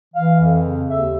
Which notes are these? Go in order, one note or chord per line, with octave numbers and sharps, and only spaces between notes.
E3 F5
F2
C#3
D#2 E5